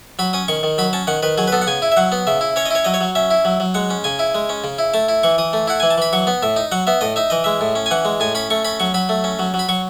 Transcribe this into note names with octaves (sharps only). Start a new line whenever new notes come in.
F#3 B5
C#4 D#6
D#3 C#6
D#3
F#3 B5
C#4 A5
D#3 F#5
D#3 B4
F#3 G#4
B4
B3 A4
F#5
C#3 G#5
E4
E5
F#3 F#5
B3
C#3 E5
E4
C#4 C#5
D#5
E4 C#5
F#3 D#5
C#5
F#3
C#4 E5
E4
F#3
F#3
G#3 F#5
C#4
C#3 G#5
E4
G#3
C#4
C#3
E4
A3 A5
E4
E3 C#6
E3 D#6
A3
E4 F#5
E3 G#5
A5
E3 B5
F#3 C#6
B3
A2 E5
D#4
F#3 F#5
B3 E5
A2 D#5
D#4 E5
E3 D#5
G#3 E5
A2
C#4
G#5
E3 F#5
G#3
A2 G#5
C#4 B5
A3 C#6
C#4 B5
F#3 C#6
F#3 B5
A3
C#4
F#3
F#3
B5
F#3 C#6